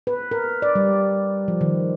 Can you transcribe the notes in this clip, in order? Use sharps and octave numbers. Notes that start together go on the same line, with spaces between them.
B4
A#4
D5
G3
F3
D#3